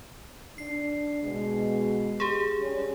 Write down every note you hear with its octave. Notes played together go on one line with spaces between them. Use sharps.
D4 C7
B2 G#3
G4 G#4
G3 C#4